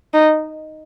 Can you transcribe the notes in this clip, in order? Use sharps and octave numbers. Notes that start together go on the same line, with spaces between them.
D#4